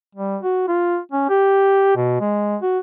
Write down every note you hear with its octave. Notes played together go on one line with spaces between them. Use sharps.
G3
F#4
F4
C#4
G4
B2
G#3
F#4